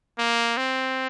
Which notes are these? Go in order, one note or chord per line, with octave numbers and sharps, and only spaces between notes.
A#3
C4